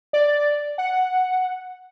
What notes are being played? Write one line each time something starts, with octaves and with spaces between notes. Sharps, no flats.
D5
F#5